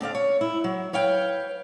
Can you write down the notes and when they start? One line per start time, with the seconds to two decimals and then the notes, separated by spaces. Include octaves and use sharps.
0.01 D3 C4 D5 F5
0.15 C#5
0.41 E4
0.64 F#3
0.93 B4 C#5 F5 G5